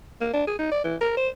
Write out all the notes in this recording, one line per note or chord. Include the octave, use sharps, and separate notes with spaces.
A#3
D4
G#4
D#4
D5
E3
A#4
C5